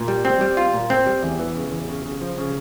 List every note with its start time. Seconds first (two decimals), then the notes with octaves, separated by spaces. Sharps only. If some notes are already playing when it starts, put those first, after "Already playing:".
Already playing: A#2
0.08 G3
0.25 C4
0.41 G3
0.57 F4
0.74 A#2
0.90 C4
1.06 G3
1.23 E2
1.39 E3
1.55 C#3
1.72 E2
1.88 C#3
2.05 C#3
2.21 F3
2.38 C#3